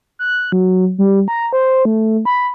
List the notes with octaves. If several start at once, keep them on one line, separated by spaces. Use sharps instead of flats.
F#6
F#3
G3
A#5
C5
A3
B5